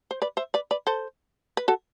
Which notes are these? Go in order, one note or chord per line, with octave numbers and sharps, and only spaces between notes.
C5
B4 D5
C5 E5
B4 D5
B4 D5
A4 C5
B4
F#4 A4